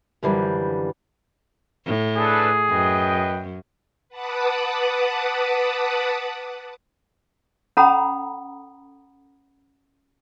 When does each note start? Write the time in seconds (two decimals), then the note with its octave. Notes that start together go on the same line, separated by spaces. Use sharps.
0.23 F#2 D3 E3 F3 G3
1.86 A2
2.17 D4 G#4 A4 B4
2.70 F#2 B4 D#5 G5
4.09 B4 F#5 A5 B5 D6 D#6
7.77 C#4 A4 F#5 A#5 B5 D#6